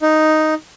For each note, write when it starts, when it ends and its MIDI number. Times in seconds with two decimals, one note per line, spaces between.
0.01 0.54 63